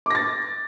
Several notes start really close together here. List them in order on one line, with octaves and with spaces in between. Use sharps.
D6 A#6 A6